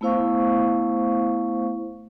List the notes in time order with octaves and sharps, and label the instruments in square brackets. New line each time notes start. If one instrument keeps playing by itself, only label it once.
[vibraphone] A3 B3 E4 C5 F5 C#6